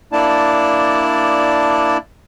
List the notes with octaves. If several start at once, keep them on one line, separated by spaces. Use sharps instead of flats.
A#3 D4 E4 D5 A5